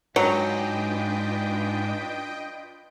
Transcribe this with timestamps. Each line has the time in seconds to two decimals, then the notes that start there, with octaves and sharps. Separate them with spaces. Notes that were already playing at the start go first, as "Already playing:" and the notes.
0.16 G#2 F#3 D4 F4 B4 D#5 G5